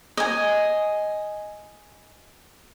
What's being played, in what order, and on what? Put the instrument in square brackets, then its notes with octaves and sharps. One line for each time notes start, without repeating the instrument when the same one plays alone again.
[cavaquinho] D#5 G#5